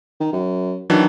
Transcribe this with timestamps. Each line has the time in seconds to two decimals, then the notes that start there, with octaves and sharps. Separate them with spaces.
0.20 D#3
0.33 F#2
0.90 D#3 E3 F#3 D4